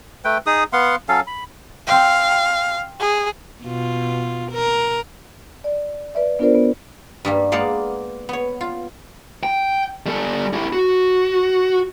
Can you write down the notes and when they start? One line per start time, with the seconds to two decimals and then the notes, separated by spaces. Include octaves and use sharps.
0.25 A3 B4 G5
0.46 D#4 G#4 D#6
0.73 B3 F5 F#5 C6
1.09 F#3 C#4 A4 F5
1.27 B5
1.87 C4 F5 G5
3.00 G#4
3.63 B2 F4
4.51 A#4
5.64 D5
6.15 B4 D5 E5
6.39 B3 D4 F4 A#4 C5 D5
6.55 B3
7.25 G2 G3 A#3
7.52 G#3 A#3 B3 D5 F5 F#5
8.29 B3 C#5
8.61 F4
9.43 G5
10.06 G3 A4
10.53 E4 G4
10.73 F#4